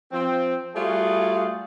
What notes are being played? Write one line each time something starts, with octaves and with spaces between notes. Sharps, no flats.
F3 C4
G3 A3 F4 F#4 G#4